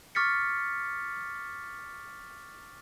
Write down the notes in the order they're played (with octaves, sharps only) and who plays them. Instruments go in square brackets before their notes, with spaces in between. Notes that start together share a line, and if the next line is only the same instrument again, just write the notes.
[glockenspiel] C#6 D6 F6 A6 B6 C#7